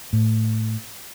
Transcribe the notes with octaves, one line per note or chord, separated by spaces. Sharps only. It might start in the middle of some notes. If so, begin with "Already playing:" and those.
A2